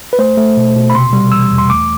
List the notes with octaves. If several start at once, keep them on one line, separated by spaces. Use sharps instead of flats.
B4
A3 C5
A3
B2
B2
B5
C3 C6
G3
E3 E6
E2
C6
A3 D6